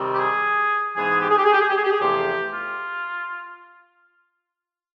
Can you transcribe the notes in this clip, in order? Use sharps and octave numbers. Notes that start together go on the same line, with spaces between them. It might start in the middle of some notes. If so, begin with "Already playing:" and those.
Already playing: C3 D#3 G3 C4
G4
G#4
G#2 E3 G#3 B3 G#4
G4
G#4
G4
G#4
G4
G#4
G4
G#4
G4
G#4
E2 C3 F3 A3 G4
F4